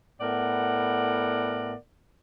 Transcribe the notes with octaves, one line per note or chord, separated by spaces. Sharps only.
A2 B3 A#4 D5 F#5